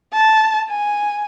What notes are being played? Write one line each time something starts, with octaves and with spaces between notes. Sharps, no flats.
A5
G#5